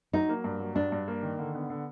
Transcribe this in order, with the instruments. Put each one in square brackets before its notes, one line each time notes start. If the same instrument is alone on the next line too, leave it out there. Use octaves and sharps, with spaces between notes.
[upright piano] F#3 [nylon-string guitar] D#4
[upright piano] A#3
G2
F#3
[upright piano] G2 [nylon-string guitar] D4
[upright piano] G2
A#3
D#3
D3
B3
D3